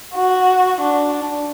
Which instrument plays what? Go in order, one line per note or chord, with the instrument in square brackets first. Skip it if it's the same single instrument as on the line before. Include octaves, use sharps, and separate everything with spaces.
[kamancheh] F#4
D4